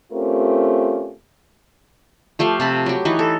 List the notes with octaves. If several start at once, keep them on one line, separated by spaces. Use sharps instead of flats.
A3 C4 C#4 F4 G4 A#4
F3 A3 G4 F5
C3 A5 B5
F#3 G4
E3 D#4 B4 C#5
A4